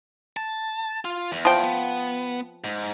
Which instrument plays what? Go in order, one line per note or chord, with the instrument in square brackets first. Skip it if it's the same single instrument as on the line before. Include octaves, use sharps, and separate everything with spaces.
[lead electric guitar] A5
F4
E2
[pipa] F3 G5
[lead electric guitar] B3
G#2